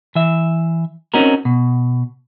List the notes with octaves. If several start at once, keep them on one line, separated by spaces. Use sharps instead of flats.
E3 E5
C4 C#4 D#4 F#4 A#4
B2